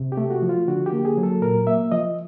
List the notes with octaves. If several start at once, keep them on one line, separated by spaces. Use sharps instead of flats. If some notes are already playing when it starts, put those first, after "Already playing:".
Already playing: C3
G4
A3
F#4
F3
F4
D3 F#4
G4
A#3
G#4
F#3
A4
A#2 A#4
A#3 E5
F3 D#5